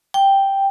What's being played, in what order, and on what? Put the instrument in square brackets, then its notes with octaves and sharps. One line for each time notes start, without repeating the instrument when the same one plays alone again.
[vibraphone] G5